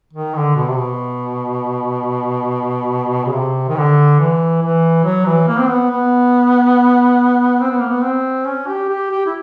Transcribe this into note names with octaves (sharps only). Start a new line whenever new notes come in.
D#3
D3
B2
C3
B2
C#3
C3
D#3
D3
E3
E3
F#3
E3
A#3
C4
B3
B3
C4
B3
A#3
B3
C4
C#4
G4
G4
G4
E4